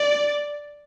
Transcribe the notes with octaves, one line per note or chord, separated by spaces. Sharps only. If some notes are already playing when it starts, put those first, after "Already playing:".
Already playing: D5